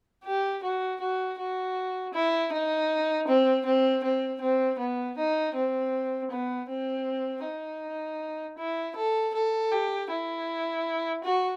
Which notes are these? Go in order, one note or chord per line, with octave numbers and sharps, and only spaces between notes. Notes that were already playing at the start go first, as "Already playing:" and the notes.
G4
F#4
F#4
F#4
E4
D#4
C4
C4
C4
C4
B3
D#4
C4
B3
C4
D#4
E4
A4
A4
G4
E4
F#4